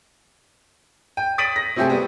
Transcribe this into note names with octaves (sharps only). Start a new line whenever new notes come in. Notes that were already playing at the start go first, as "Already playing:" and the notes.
G5
D#6 A6 B6 D7 D#7 F#7
A#6
C3 F#3 A3 C4 G4 G#4
G3 B3